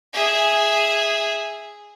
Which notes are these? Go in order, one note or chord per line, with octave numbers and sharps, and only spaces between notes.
G#4 E5